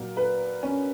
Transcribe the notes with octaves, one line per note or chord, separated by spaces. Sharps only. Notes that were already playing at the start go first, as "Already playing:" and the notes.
Already playing: A#2 F#3 A#3 A#4
B4
C#4